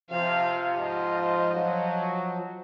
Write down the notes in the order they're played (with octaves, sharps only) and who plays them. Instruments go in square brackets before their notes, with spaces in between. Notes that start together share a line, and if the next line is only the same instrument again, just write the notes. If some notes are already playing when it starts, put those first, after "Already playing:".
[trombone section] C3 F4 [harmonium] F3 [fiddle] F5
[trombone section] G#2 F4 [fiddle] D#5
[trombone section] F#3